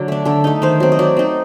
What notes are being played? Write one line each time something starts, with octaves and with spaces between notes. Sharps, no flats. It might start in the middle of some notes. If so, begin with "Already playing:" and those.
Already playing: D3 F#3
A3 D4
D3 A4
A3 D#4
D#3 C5
F#3 C4
D#5
F#3 D5
C4 D#4